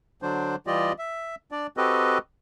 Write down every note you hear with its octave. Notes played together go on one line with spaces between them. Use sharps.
D3 F#3 D4 C5
E3 G3 F4 G4 D5 D#5
E5
D4 D5
C4 F#4 G4 A4 B4 D#5